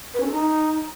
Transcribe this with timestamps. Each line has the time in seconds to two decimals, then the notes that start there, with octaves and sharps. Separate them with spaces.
0.14 B4
0.20 C#4
0.26 A4
0.32 D#4